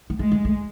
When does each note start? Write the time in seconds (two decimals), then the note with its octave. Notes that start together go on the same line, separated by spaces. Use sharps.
0.10 B3
0.19 G#3 A3
0.32 A3
0.45 A3